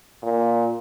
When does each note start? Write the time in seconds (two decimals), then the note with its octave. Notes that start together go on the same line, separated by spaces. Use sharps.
0.23 A#2